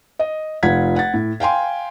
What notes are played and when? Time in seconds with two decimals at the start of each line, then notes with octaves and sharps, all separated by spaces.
0.19 D#5
0.63 F1 F4 F#5 G#6 B6
0.96 F#5 A6
1.14 A2
1.40 F5 G5 G#5 C6